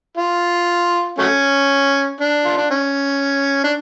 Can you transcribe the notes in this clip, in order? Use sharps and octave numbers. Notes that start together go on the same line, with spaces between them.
F4
F#3 A3 C#4
D4
F4
D4
C#4
D4